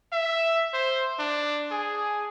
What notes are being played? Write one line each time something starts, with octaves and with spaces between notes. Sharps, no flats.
E5
C5
D4
G#4